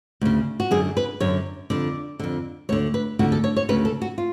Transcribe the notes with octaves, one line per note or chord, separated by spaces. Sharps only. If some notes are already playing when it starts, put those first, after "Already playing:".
D2 C#3
F#4
F#2 D3 G#4
B4
F#2 D3 C#5
F2 D3 D5
F2 D3
D2 D3 C#5
B4
D2 D3 F#4
A4
C#5
C#5
D2 C#3 B4
A4
F#4
F4